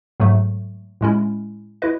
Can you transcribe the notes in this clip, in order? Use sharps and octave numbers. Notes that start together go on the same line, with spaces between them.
G#2 F#3 A3
A2 G#3 C#4 E4
E4 B4 D#5